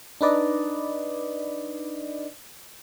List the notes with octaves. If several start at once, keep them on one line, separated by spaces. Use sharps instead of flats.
D4 D#4 B4 D5 D#5